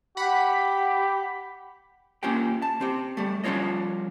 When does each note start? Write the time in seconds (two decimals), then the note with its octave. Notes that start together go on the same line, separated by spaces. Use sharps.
0.17 G4 F#5 B5 B6
2.23 A#3 C#4 F4 G4 G5
2.62 A5
2.81 C4 G4
3.17 G3 A3
3.44 F3 G3 C#4 F4 C#5 D#5